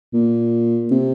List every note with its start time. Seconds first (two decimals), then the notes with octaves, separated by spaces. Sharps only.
0.14 A#2
0.91 C3